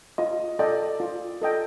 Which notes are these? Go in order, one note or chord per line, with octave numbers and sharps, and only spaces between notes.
F4 D#5
A4 D5 D#5 G5
F4
A4 D#5 G5